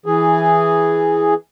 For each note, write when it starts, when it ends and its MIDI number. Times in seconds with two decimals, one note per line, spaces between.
0.06 1.34 52
0.06 1.34 68